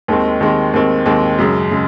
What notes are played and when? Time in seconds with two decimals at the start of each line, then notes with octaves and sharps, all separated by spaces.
0.08 D#2 D#3 G#3 C4
0.40 D#2 D#3 G#3 C4
0.74 D#2 D#3 G#3 C4
1.06 D#2 D#3 G#3 C4
1.38 F#2 C#3 G#3
1.71 C#3 G#3